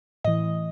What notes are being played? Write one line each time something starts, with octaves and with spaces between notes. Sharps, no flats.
A2 E3 D#5